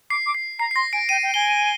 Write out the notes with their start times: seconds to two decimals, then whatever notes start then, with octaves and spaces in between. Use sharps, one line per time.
0.10 D6 C7
0.26 D6
0.35 C7
0.59 A#5 C7
0.71 C7
0.76 C6 A#6
0.93 G#5 D7
1.09 G5 D#7
1.23 G5
1.34 G#5 G7